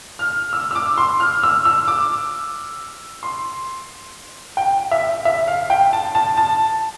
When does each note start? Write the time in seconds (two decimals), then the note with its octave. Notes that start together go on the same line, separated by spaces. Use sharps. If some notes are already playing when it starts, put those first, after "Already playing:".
0.19 F6
0.53 E6
0.71 E6
0.75 D6
0.98 C6
1.20 F6
1.43 E6
1.65 E6
1.88 D6
3.23 C6
4.57 G5
4.91 E5
5.25 E5
5.47 F5
5.70 G5
5.93 A5
6.15 A5
6.37 A5